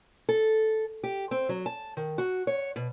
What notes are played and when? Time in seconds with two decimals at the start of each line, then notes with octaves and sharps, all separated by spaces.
0.29 A4
1.04 G4
1.31 C4
1.49 F#3
1.66 A5
1.97 D#3
2.18 F#4
2.47 C#5
2.76 B2